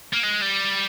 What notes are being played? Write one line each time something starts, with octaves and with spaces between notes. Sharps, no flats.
A#3
G#3
G3